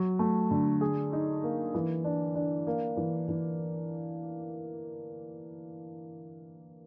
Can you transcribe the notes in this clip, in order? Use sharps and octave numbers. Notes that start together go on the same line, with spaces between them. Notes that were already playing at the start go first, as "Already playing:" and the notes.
Already playing: F#3
A3
D3
G#4
D#4
A#3
E3
D4
D4
A#3
E3
E3